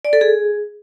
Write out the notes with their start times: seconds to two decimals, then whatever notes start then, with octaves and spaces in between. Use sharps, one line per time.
0.05 D5
0.13 A4
0.21 G#4